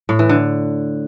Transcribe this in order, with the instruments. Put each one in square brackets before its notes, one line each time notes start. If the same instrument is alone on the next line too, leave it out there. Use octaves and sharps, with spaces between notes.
[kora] A2
E3
D3